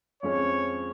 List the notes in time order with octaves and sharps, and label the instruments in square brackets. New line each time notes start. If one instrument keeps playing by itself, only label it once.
[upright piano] F2 F3 G#3 C#4 [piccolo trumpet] C#5